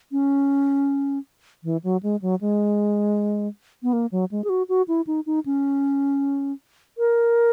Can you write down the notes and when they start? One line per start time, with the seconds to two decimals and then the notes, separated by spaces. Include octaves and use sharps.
0.12 C#4
1.64 E3
1.84 F#3
2.03 G#3
2.22 F#3
2.41 G#3
3.83 B3
3.93 A#3
4.12 F#3
4.31 G#3
4.44 G#4
4.49 F#4
4.69 F#4
4.88 E4
5.07 D#4
5.26 D#4
5.46 C#4
6.98 A#4